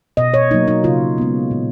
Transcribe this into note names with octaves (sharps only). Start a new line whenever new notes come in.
B2 D#5
C#5
F#3 A#3 D#4
D#4
C#3 F4
G#3 B3
A#2